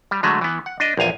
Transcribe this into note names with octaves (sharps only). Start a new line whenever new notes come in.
G3
D3 F#3 G#3 A3
E3 B3
F#5
D4 D#5
A#1 E2 F5 G#5